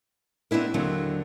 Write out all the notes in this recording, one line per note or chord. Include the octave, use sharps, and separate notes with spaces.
B3 C4 D4 E4 A#4
D#2 D3 F#3 C4